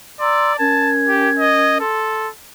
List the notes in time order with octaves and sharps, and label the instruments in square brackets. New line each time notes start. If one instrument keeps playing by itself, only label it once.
[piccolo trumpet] D5 [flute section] A#5 C6 E6
[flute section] C#4 A#4 G#6 [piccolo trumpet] A5
[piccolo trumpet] G4
D#5
[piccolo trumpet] A4 [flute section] C6